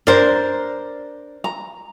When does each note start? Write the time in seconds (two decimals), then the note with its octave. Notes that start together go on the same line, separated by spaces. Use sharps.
0.07 D4 A#4 C5 D5 A#5
1.44 A#5